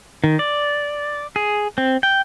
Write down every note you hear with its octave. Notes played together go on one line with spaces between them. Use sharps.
D#3
D5
G#4
C4
G5